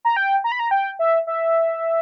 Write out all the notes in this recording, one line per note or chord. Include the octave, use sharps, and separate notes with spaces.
A#5
G5
A#5
B5
A#5
G5
E5
E5